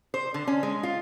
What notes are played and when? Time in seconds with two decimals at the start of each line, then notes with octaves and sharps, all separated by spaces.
0.14 C5
0.34 D3
0.47 C#4
0.63 G#3
0.83 F4